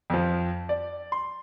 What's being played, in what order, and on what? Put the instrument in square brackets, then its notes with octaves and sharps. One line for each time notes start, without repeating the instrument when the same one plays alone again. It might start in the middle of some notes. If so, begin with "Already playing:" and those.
[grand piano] F2 F3
D5
C6